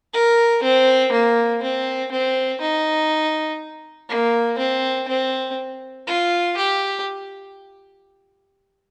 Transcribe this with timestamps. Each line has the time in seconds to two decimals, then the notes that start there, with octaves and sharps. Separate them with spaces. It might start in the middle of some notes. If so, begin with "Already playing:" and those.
0.13 A#4
0.63 C4
1.12 A#3
1.62 C4
2.12 C4
2.61 D#4
4.09 A#3
4.58 C4
5.08 C4
6.07 F4
6.57 G4